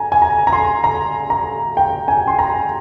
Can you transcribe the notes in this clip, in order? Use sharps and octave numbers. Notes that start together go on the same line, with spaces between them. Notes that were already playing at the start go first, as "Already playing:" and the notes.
Already playing: G#5 A#5
G#5
A#5
A#5
C6
A#5
A#5
G5
G#5
C6
A#5